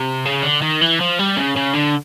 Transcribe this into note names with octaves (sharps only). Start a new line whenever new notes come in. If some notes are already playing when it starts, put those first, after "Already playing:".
Already playing: C3
C#3
D3
D#3
E3
F3
G3
C#3
C#3
D3